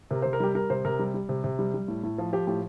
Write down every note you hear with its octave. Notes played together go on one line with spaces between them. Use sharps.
C3 A#4
C3 C5
A#4
G3 G4
G3 A#4
C3 C5
C3 A#4
G3
G3
C3
C3
G3
G3
A2
A2
F3
F3 G4
A2 G4